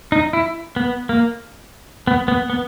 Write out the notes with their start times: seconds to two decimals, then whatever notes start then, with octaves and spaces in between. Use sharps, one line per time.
0.12 D#4
0.33 E4
0.76 B3
1.09 A#3
2.07 B3
2.28 B3
2.50 B3